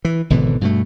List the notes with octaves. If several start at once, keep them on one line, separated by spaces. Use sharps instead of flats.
E3
G#1 B2 D3 E3
G2 B2 A3